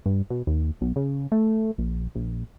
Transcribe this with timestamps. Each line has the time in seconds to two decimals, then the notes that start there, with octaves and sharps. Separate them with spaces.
0.06 G2
0.30 B2
0.47 D#2
0.81 B1
0.96 C#3
1.32 A3
1.78 A#1
2.15 A#1